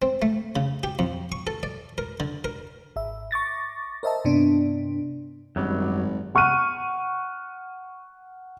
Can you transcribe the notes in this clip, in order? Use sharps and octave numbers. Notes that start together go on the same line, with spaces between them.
C4
A3
C#3
G4
F2
C#6
A4
D5
A#4
D3
A#4
G#1 E5
C#6 D6 A6 A#6
A#4 C5 D#5 E5 A5
G2 C3 B3 D4
G#1 F#2 F#3 G3
F#5 C#6 F6 F#6 D#7